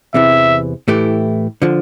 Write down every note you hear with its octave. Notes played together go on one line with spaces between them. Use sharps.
E2 C3 E3 E5
A2 E3 A3 E4 G4
D3 F3